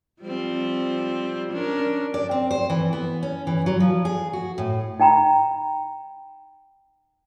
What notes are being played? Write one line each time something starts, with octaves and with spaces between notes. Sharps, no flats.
F3 G3 C4
C#4 D4 A#4
D5
C4
C5
E3
B3
C#4
E3
F#3
F3
G#4
F#4
A2
D#4 G5 A#5 B5